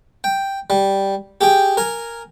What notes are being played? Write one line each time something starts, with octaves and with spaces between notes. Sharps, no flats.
G5
G3
G4 G#4 G5
A#4 G#5